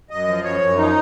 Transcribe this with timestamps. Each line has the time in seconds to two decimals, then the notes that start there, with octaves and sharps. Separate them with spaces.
0.10 F#2 D#5
0.27 F3
0.44 F#2 C#5
0.61 F#2
0.78 F3 D#4